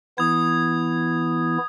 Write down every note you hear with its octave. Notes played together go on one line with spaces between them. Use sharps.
E3 B3 E4 D#6 G#6